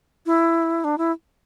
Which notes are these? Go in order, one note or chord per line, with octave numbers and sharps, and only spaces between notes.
E4
D4
E4